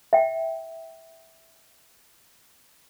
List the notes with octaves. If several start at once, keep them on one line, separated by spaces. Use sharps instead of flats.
E5 G5